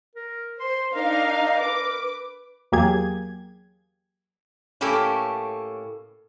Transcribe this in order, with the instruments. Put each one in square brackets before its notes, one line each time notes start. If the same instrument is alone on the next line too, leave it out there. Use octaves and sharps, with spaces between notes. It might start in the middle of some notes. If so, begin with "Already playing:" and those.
[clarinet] A#4
[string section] C5 [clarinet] C6
[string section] D4 D#4 F5 [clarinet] A#4
[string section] B4 D6
[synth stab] E2 F#3 A#3 G4 G#4 G#6
[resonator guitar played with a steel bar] A2 A#3 C#4 G4 A4